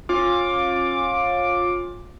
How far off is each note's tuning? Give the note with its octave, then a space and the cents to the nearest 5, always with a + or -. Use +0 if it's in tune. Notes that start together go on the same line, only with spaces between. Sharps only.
C#4 -30 F4 +20 D6 +0